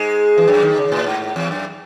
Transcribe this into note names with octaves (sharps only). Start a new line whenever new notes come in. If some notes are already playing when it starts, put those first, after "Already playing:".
Already playing: G#2 G#3
E3
F#2 F#3
D#2 D#3
C#3
A2
G#2
E2
F#2